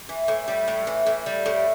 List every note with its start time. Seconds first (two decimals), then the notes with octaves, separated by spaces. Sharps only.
0.09 E3
0.28 A2
0.48 G3
0.68 A2
0.87 E3
1.06 A2
1.26 G3
1.46 A2